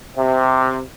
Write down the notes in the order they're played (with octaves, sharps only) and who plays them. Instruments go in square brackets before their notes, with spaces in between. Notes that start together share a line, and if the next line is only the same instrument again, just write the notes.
[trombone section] C3